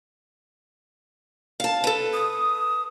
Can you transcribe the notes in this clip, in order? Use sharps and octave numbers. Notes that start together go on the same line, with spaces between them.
F5 A5
A4 B4
D#6